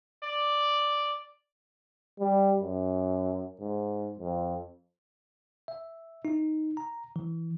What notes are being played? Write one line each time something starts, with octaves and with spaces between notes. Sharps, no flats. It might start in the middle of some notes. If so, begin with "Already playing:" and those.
D5
G3
F#2
G#2
F2
E5
D#4
A#5
E3